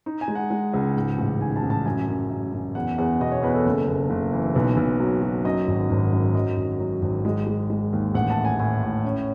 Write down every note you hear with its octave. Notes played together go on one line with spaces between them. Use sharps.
D#4
G#5
G#3
F#5
G#3
C#2
G#2
A1
D#3 G#5
A5
A1
A5
F#2 G#5
F#2
F#2
F#2
E2 F#5
E2 F#5
B2 D#5
C#5
E2 B4
A4
F#1
F#1
F#1
E3
B1 B4
B1
F#3
F#3
F#2 D#5
G#1
G#1
F#2
F#3 D#5
G#1
F#3
G#1
G#3 D#5
G#3
G#3
D#2
A1 F#5
A5
A2
G#5
A2 G#5
A2
C#4